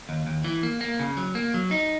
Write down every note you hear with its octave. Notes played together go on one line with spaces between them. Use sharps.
D#2
D#2
E3
A#3
A#3
C#3
F#3
A#3
F#3
D#4